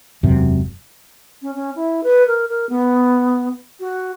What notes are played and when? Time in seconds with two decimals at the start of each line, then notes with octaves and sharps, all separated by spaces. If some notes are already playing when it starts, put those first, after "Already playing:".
0.23 E1 F#2 C3
1.42 C#4
1.55 C#4
1.76 E4
2.03 B4
2.27 A#4
2.48 A#4
2.69 B3
3.80 F#4